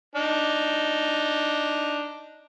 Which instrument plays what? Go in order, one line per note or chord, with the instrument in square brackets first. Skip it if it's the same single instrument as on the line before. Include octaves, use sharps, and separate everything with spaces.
[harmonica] D4 D#4